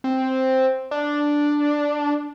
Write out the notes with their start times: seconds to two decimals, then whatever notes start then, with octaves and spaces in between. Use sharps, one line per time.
0.04 C4
0.91 D4